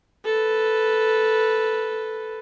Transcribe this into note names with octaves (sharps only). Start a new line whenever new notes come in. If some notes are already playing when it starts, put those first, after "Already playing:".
A4 B4